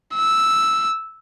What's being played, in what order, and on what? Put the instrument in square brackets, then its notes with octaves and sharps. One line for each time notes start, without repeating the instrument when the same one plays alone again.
[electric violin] E6